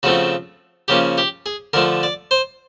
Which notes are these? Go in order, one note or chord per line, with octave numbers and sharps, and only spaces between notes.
C#3 F3 A3 C4 F#4
C#3 F3 A#3 C#4 G4
G4
G#4
D3 F3 A3 A#4
D5
C5